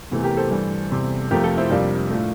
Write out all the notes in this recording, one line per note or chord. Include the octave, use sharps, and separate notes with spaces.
E2 C3 E3 A3
G4 A#4
A4 C5
G2 E3 G3
E2 C3 G3
F2 C3 F3 A3 G4 A#4
F4 A4
C4 E4
F2 C3 G3 A#3 D4
A2 F3 A3